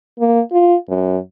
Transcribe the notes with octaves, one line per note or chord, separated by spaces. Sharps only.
A#3
F4
F#2